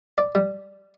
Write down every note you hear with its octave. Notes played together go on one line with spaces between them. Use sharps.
D5
G3